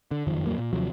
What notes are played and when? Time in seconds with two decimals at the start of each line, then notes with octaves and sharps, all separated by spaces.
0.11 D3
0.27 F#1 F2 D#3 F3
0.46 D1 F2 F#3 A#3
0.58 A#2
0.73 D#2 C3 F3 F#3